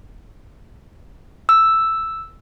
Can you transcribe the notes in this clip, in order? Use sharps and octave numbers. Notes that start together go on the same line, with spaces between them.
E6